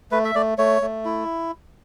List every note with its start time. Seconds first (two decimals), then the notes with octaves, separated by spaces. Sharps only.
0.11 A3 B4
0.24 E5
0.35 A3 D5
0.58 A3 C#5
0.82 A3
1.05 E4